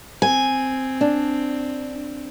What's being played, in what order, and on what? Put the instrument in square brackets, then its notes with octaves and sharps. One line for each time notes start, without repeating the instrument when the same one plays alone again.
[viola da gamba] C4 [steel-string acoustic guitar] G#5
[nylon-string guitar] D4